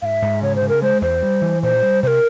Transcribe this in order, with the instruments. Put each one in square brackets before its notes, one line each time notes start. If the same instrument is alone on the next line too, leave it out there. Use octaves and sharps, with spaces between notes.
[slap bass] G#2 [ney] E5 F5
[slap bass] G#2
[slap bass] C#3 [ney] C#5
[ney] C5
[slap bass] C#3
[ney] A#4
[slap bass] G#3 [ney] C5
[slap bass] E2 [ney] C5
[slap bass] G3
E3
[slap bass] A#2 [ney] C5
[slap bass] G3
[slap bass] C3 [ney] C5
[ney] A#4